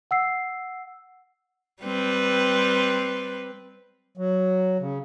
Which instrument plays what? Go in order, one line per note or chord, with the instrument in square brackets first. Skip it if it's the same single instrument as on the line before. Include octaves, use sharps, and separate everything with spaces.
[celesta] F#5 E6 C7
[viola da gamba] G3 C4 B4
[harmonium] F#3
C#3